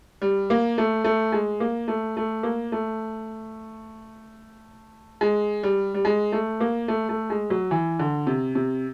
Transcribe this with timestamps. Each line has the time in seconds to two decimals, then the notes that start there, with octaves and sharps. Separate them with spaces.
0.22 G3
0.50 A#3
0.78 A3
1.04 A3
1.32 G#3
1.60 A#3
1.88 A3
2.17 A3
2.43 A#3
2.72 A3
5.21 G#3
5.63 G3
5.94 G3
6.05 G#3
6.32 A3
6.60 A#3
6.88 A3
7.09 A3
7.30 G#3
7.50 F#3
7.71 E3
7.99 D3
8.27 C3
8.55 C3